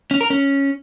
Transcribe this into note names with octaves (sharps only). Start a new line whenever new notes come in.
C#4
A#4
C#4